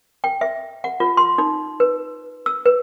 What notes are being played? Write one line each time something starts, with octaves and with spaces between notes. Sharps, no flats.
G5
E5
F#5
F4
C6
D#4
B4
E6
B4